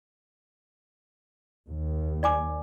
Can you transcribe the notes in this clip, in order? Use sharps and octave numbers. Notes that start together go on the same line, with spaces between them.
D#2
D5 G#5 D6